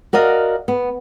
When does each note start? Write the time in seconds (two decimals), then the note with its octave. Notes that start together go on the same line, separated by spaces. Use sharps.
0.13 F#4 A#4 D5 D#5 F5
0.68 B3